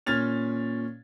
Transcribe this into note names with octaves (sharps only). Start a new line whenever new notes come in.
A#2 C#4 F6 G#6 A6 F7